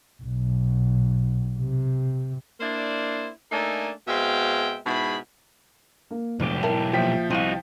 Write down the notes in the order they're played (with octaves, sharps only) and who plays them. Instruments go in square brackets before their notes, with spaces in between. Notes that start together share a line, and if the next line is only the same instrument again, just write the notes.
[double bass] B1
C3
[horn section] A#3 D4 E4 C5 D5
A3 A#3 D4 D#4 A4 G#5
B2 G#3 C4 E5 F5 G5
G#2 B2 E4 G#4 B5
[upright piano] A#3
[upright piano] F1 D7 [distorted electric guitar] B1 G4 [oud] B2
[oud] E4 A#4 [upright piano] A5
[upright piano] A#2 E5 [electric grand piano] F3 G5 B6
[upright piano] C2 [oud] C4 F4 [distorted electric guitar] D#4 F#4